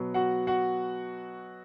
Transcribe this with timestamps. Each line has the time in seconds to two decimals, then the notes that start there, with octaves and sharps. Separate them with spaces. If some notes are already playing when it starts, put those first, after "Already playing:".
Already playing: B2 F#3 B3
0.14 F#4 F#5
0.47 F#4 F#5